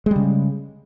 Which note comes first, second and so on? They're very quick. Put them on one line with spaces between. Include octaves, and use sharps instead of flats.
G#3 G3 C#3